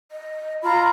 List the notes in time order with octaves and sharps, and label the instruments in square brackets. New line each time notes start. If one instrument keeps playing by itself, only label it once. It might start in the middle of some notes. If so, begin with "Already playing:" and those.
[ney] D#5
[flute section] F4 A#5 [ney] B5